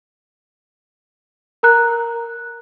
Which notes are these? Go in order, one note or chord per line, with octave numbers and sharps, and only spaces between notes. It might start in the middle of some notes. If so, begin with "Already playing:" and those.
A#4 A#5 F#6